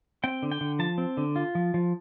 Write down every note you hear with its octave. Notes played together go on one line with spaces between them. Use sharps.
C4 G5
D3
G5
D3
F3 A5
C4
D3
F4
F3
F3